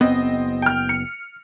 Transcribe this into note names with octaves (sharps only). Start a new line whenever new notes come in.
F#1 B3 C4 D#5
G5 F6
C#7